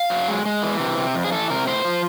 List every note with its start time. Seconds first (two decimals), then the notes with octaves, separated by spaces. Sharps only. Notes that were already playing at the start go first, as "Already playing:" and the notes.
Already playing: F5
0.10 F#3
0.28 G#3
0.45 G#3
0.63 E3
0.79 C3
0.97 C3
1.15 F2
1.24 G#4
1.32 E3 A4
1.50 C3 A#4
1.67 A2 C5
1.84 F3